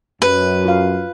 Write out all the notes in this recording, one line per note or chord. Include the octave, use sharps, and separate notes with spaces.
F#2 B4
F4 F5